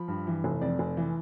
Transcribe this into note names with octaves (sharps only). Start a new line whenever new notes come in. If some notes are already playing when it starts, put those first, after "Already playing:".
Already playing: F3 B5
G2
E3
F1
F2 D5
F1
E3